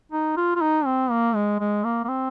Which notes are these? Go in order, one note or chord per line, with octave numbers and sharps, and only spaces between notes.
D#4
F4
F4
D#4
C4
A#3
G#3
G#3
A#3
A#3
C4